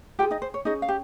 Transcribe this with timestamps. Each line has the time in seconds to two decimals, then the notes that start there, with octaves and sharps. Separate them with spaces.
0.19 F4 G4 G5
0.23 G#4
0.31 D#4 D#5
0.42 C5
0.54 C#5
0.65 C#4 D#4 G#4 D#5
0.82 F5
0.88 G4